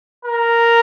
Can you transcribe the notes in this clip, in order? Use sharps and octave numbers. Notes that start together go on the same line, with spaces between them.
A#4